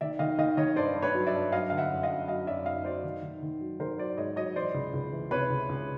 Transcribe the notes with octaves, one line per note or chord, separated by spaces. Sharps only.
D#3 D5 E5
D#3 D#5 F5
D#3 D#5 F5
D#3 C#5 D#5
G2 C5 D5
G2
B4 C#5
F#3
D5 E5
G2
F#3 D#5 F5
D3 F5
E5 F#5
F#2
D#5 F5
F#2
F#3 D#5 F5
F#2 D5 E5
F#2 D#5 F5
F#3 C5 D5
D#3
D#3
D#3
F#3
D#3 A#4 C5
F#3 C5 D5
G#2 C#5 D#5
F#3 C#5 D#5
E3 C5 D5
C#2
C#2
E3
C3 B4 C#5
C#2
C#2